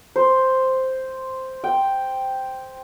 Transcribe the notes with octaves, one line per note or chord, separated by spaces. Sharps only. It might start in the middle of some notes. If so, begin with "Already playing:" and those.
C5
G5